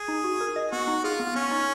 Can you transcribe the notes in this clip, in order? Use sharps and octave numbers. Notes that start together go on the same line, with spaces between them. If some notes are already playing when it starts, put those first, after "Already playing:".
Already playing: G#4
D#4
F#4
A#4
D#5
B3 F#4
D#4
F4 G#4
B3
B3 C#4
D#4